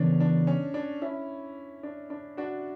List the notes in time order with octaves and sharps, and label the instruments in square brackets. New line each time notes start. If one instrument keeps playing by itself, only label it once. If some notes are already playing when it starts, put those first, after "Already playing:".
Already playing: [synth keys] C#3 E3 B3 [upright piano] C#4 D4
[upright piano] D4
C#4
D4
C#4 E4
D4
D4
D4 F#4